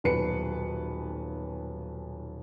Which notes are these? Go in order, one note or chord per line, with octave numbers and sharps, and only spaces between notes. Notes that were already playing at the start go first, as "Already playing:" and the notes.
D#1 B1 B4 C#7